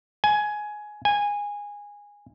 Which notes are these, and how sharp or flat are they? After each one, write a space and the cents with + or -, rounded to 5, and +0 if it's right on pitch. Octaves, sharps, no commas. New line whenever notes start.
G#5 +15
G#5 -15